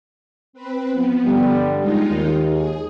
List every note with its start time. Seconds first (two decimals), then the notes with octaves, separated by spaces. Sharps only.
0.53 C4 B4
0.92 F3 B3
1.25 G2 D3 G3
1.79 G#3 D#4 F4
2.11 D#2
2.48 G#4